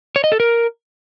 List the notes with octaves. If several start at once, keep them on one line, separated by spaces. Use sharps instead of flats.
C#5
D#5
A4
A#4